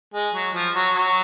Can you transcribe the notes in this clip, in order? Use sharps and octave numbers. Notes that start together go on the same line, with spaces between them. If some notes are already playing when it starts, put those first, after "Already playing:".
G#3
F#3
F3
F#3
F#3